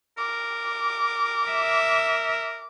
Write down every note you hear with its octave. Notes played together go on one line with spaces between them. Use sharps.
A#4 D6
E5